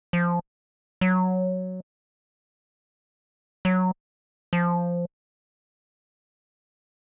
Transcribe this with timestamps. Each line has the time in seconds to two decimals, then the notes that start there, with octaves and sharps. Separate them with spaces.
0.13 F3
1.01 F#3
3.65 F#3
4.53 F3